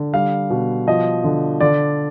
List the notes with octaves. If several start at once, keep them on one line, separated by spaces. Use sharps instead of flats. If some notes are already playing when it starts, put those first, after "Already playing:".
Already playing: D3
G3 F5
B2
F3 D#5
D3
D3 D5